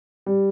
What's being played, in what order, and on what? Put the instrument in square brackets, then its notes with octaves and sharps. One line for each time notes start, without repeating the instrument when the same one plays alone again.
[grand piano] G3